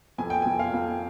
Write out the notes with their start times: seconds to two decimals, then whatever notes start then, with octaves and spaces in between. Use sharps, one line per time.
0.18 F2 G#5
0.30 G5
0.42 F2 G#5
0.59 F5
0.73 F2